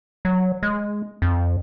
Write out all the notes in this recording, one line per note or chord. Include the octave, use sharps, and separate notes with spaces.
F#3
G#3
F2